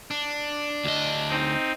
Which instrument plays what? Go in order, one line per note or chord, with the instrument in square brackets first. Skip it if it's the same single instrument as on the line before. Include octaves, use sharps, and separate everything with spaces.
[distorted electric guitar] D4
[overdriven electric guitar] D2 D#5
[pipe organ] C4 D#4